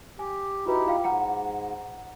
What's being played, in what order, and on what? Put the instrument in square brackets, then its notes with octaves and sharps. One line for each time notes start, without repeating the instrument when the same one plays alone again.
[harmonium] G4 [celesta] G#5
[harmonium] D#4 E4 G4 [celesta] F#4 B4
[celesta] F4 F5 G5
[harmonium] G#2 [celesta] F#5 A#5 C#7